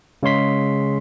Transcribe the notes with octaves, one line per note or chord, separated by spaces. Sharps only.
C#3 G#3 C#5 C6 B6